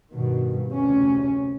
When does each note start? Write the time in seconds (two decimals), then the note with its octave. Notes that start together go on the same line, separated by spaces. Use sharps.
0.11 G2 B2 D#3
0.70 F1 D2 C3 C#4